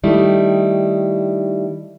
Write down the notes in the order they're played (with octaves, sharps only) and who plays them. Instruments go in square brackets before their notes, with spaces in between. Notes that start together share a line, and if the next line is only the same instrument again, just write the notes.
[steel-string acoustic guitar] D#3 G3 A3 E4